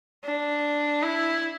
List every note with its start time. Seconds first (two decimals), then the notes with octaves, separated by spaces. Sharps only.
0.25 D4
1.02 E4